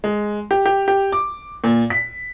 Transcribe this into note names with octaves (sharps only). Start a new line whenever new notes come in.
G#3
G4
G4
G4
D6
A#2
B6